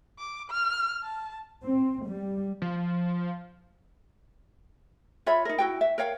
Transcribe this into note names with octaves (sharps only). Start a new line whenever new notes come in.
D6
F6
A5
C4
G3
F3
F4 C#5 E5 B5
D#4 A#4
E4 F#4 G5
E5
A#4 C#5 F5 G5